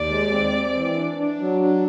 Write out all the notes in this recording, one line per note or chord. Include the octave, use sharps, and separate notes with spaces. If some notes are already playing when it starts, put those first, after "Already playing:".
Already playing: D#2 D5
G#3
C4
C4
E3
D4
D4
F#3
D4